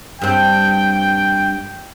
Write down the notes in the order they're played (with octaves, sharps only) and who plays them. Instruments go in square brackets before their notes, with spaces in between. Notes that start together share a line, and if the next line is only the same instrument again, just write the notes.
[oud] G2 C4 [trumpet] G5